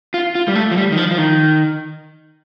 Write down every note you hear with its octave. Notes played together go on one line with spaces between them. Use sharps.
F4
F4
G3
A3
F3
G3
D#3
F3
F3
D#3